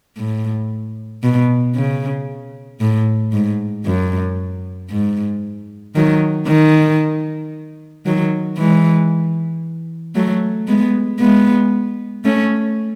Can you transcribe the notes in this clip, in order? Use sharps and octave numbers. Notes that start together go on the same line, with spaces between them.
A2
B2
C#3
A2
G#2
F#2
G#2
D#3 F#3
D#3
D#3 F#3
E3 G#3
F#3 A3
G#3 B3
G#3 B3
A3 C#4